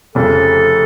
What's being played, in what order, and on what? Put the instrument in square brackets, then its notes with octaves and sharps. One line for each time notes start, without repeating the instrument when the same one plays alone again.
[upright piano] F1 F2 C#3 [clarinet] A4